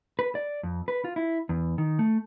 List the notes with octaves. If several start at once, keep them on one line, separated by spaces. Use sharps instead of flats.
B4
D5
F2
B4
F4
E4
E2
D#3
A3